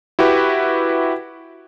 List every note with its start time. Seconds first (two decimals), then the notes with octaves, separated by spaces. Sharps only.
0.19 E4 F#4 G4 B4